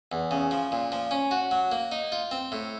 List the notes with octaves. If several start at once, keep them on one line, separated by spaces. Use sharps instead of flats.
E2
C#3
F3
A#2
F3
C#4
F#4
F#3
A#3
D#4
F4
C4
A2